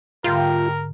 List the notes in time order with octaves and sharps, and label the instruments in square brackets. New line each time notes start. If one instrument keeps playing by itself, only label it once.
[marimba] G#2 D3 [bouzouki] G3 A3 G5 [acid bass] F4 [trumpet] A#4